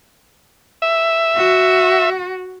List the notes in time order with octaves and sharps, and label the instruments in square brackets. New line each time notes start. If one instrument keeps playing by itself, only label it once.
[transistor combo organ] E5
[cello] F#4